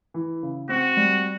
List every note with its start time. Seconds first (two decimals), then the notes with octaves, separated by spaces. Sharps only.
0.14 E3
0.43 C#3
0.69 C4 F#4
0.97 G3